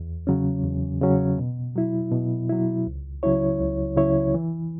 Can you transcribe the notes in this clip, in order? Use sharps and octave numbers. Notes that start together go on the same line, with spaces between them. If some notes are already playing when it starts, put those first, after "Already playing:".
Already playing: E2
C#3 F#3 C#4
E2
C#3 F#3 C#4
B2
F#3 E4
B2
F#3 E4
C#2
C#3 F#3 E4 C#5
C#2
C#3 F#3 E4 C#5
E3